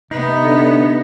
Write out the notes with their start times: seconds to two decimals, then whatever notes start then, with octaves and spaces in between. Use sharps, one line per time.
0.11 C3 B3 D#4
0.43 D3